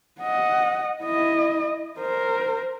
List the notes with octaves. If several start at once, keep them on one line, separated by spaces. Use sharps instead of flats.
D#5 F#5
E4 D#5
A#4 C5